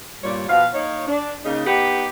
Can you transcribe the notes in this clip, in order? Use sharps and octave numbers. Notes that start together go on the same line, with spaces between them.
G2 A#2 G3 C#5 D5
B2 F3 B3 F5
A#3 D#4 C#5
D4
C#3 A#3 D#4
B3 D#4 G4